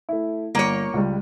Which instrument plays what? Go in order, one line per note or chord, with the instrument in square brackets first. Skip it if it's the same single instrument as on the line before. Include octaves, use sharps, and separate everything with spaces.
[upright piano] A3 E4
[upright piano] G1 D#7 [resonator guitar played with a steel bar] A#3 C#5
[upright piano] C#2 G3